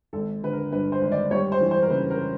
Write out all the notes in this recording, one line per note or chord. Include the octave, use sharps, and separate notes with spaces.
G#1 A4
D3 B4
A#4
G2 B4
C5
G#1
D5
G3 C#5
C5
E3
C5
A#4
C#3 B4
A#4